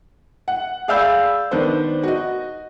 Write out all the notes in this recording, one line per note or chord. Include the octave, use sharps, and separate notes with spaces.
F#5
G#4 D5 F5 B5 E6 G6
D#3 B3 D4 C5
F#4 D#5